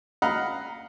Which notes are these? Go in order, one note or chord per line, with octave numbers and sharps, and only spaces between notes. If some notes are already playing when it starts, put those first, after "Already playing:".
D#5 F5 F#5 A#5 B5